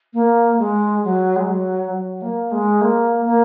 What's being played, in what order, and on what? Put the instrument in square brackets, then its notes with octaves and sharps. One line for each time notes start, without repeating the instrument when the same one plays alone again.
[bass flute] A#3
G#3
F#3
G#3
F#3
F#3
A#3
G#3
A#3
A#3